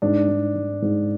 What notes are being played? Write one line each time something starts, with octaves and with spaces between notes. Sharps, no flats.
G#2 D4
G#2
G#2
G#2